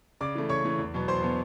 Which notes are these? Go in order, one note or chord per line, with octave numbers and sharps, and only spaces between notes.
C#3 D5 D6
E3 A3
C#3 C#5 C#6
E3 A3
E2
B2 F#3 B3
E2 C5 C6
B2 F#3 B3